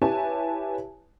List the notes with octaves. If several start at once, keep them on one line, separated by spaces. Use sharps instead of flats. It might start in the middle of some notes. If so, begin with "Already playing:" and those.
E4 G4 B4 C#5 G#5 A5